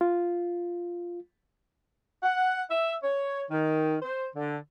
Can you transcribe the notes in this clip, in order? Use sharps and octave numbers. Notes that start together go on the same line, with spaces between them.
F4
F#5
E5
C#5
D#3
C5
D3